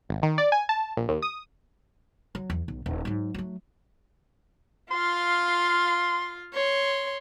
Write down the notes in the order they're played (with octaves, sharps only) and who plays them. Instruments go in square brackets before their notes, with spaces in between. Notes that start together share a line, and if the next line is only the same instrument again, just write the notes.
[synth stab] G#1
D#3
D5
G#5
A5
A#1
D#2
D#6
[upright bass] F#3
E2
B1
D#1
G#2 F#3
F#3 A3
[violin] F4 F5 [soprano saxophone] C6
[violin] C#5 C6